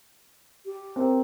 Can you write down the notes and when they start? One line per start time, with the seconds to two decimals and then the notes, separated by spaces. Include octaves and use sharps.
0.65 G4
0.96 C4 A#4